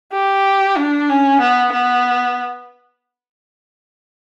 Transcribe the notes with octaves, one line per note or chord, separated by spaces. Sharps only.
G4
D4
C#4
B3
B3